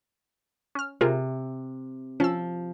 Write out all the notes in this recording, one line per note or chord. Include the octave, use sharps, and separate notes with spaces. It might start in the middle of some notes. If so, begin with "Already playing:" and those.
C#4 F6
C3 F4 G#4 A#4
F3 C#4 E6